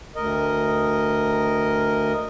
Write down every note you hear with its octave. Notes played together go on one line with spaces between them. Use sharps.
D2 A#4 D#5